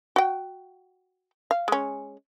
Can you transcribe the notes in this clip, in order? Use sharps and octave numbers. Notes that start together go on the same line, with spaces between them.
F#4 G5
F5
G#3 C#4